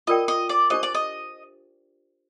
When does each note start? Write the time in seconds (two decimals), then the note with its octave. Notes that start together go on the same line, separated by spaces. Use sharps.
0.07 F4 A#4 D5 D#5 G5
0.28 D#5
0.49 D5
0.70 D4 G4 C5 D#5
0.83 D5
0.95 D#5